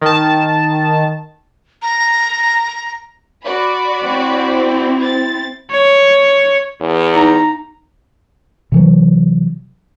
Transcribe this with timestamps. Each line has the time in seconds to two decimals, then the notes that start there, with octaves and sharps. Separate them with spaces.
0.01 D#3 A5
1.82 A#5
3.45 F#4 D5 B5
4.03 C4 E4
5.03 A6
5.71 C#5
6.81 E2
7.14 D#4 A#5
8.72 C3 E3 F#3